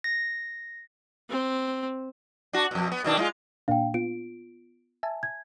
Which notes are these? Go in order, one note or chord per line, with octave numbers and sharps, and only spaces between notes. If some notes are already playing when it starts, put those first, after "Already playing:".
A#6
C4
D4 F#4
F2 B2
B3
B2 D#3 D4
G#3 D#4 F4
A#2 A#3 D4 F5 G5
B3 F4 D7
E5 G#5 A5
G#6